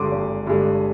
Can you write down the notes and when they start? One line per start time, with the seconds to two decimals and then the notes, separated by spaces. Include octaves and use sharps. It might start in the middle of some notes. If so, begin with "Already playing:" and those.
Already playing: G#1 G2 D3 G#3 C6 D6
0.11 G#1
0.47 G2 D3 G#3